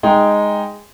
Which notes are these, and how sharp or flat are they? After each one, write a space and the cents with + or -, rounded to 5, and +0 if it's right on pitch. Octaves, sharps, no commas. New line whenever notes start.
G#3 -5 D#4 +0 G5 +0